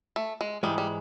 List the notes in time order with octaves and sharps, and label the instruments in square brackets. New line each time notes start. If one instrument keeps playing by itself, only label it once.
[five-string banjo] A3
G#3
[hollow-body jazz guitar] G#2 E3 G#3 [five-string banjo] G3
[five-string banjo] G3